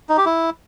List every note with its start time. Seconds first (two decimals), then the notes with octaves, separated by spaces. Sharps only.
0.09 D#4
0.17 G4
0.26 E4